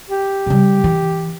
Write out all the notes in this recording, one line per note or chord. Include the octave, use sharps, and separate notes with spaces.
G4
C#3 G3
E3